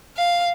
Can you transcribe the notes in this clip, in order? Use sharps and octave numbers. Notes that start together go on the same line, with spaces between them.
F5